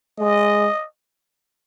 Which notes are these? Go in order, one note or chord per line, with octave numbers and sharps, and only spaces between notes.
G#3 D#5